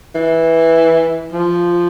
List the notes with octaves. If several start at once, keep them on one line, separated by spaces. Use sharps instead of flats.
E3
F3